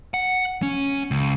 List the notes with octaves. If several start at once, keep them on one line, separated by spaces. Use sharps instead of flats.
F#5
C#4
C#2